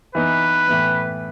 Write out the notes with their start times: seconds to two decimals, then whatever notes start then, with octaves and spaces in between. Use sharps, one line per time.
0.15 E3 B3 D#4 B4
0.68 A2 E3 B3